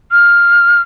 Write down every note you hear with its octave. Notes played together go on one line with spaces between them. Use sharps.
F6